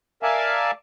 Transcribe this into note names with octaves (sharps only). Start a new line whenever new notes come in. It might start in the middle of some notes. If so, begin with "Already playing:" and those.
A#4 D5 E5 F5 G#5 A5